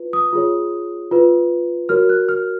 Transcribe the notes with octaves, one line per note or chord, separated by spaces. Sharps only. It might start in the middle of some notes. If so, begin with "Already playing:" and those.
Already playing: F4 B4
D#6
F4 G#4 C#5
F4 B4
F#4 A#4 C#5 F6
F#6
F6